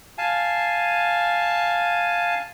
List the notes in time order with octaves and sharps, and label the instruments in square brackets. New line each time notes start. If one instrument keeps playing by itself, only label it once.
[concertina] F5 G#5 A5